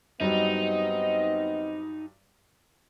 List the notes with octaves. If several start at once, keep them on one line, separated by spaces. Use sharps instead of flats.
G2 F#3 G3 B3 C4 D#4 D#5